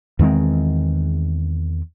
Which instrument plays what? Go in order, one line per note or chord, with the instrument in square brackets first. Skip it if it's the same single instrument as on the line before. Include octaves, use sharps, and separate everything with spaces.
[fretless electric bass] E2 D#3 G#3 C4